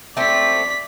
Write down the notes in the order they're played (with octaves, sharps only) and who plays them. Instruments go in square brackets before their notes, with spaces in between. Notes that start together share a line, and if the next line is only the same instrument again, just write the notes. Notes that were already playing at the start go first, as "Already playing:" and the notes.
[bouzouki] A3 C4 [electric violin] D5 B6